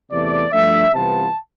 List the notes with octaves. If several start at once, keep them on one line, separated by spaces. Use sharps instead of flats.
E2 C3 E3 A3 D5
G2 F3 A3 D4 E5
C2 C3 E3 B3 F4 A5